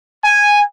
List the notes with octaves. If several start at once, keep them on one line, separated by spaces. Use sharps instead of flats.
G#5